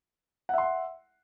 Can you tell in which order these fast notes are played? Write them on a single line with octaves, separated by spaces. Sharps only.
F#5 E5 C6